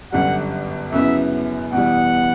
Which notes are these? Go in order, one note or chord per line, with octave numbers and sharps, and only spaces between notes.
G1 F#2 D3 G3 F#5
F#2 C#3 F#3 B3 E4 E5
E2 B2 G3 F#5